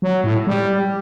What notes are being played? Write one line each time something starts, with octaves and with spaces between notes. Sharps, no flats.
F#3
A2
G3